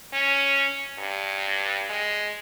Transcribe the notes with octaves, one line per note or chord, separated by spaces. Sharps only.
C#4
G2
G#3